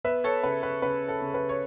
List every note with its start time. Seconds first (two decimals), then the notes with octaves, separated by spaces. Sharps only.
0.04 B3 B4 E5
0.24 A4 C#5
0.43 C#3 B4
0.63 B4
0.82 C#3 B4
1.08 A4
1.21 C#3
1.34 B4
1.49 C#5